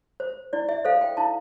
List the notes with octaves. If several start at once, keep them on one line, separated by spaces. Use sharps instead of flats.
C5
E4 D5
E5
A4 C5 F5
G5
E4 A5